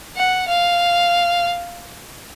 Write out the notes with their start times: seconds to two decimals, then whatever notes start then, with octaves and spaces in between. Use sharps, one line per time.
0.17 F#5
0.48 F5